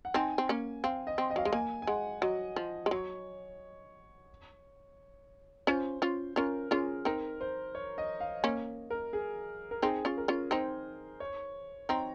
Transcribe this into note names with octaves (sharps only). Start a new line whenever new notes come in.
F#5
C4 D#4 G#5
C4
A#3 C#4
C4 F5
D#5
C4
D#5
F#3 F5
G#3 D#5
A#3 G#5
G#5
G#3 F#5
F#3 D#5
F3
G#3
F#3 C#5
C#4 F4 C5
C#4 F4
C#4 F4 A#4
C#4 F4 G#4
C4 D#4 A#4
C5
C#5
D#5
F5
A#3 C#4
A#4
G#4
A#4
C4 D#4 G#4
C#4 F4
A#4
C#4 F4
C4 D#4 C5
C#5
C4 D#4 A#5